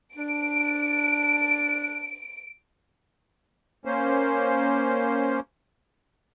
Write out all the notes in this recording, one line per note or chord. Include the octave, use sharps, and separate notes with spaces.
D4 D7
A#3 C#4 C5